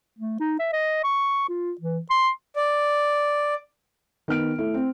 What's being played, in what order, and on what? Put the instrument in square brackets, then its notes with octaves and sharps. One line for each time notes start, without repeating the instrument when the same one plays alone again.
[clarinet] A3
D#4
E5
D#5
C#6
F4
E3
C6
[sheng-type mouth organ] D5
[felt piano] D#3 B3 F6 D7
A3 E4
C4